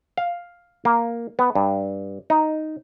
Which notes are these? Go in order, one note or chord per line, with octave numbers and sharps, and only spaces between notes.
F5
A#3
B3
G2
D#4